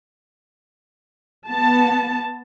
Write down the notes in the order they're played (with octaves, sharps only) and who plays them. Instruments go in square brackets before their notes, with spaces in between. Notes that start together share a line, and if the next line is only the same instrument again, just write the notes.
[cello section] B3 [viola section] A5